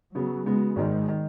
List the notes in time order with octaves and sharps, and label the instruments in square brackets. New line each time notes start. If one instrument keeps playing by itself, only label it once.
[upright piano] C#3 B3 F#4 [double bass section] F#3
[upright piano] C#3 B3 F#4 [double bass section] G#3
[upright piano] G#1 G#2 D#3 [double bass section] G#3
[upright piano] D#3